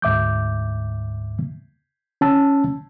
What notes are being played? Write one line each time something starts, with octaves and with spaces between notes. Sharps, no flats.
D2 G#2 E5 D6 G6
C#4 A5 E6